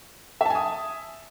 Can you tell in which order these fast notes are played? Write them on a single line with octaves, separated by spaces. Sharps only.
E5 A5 G#5 D#6